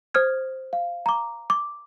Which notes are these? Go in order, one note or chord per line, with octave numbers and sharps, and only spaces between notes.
C5 D#6 F6 G#6
F5
A#5 D6
D6